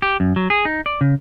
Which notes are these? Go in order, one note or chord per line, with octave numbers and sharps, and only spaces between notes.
G4
F#2
F#3
G#4
D#4
D5
C#3